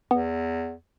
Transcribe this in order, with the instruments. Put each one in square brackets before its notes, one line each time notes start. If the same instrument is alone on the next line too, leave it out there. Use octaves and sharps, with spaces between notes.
[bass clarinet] E2 [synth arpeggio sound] B3